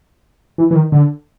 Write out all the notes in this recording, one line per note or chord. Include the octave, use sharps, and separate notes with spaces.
E3
E3
D#3
D3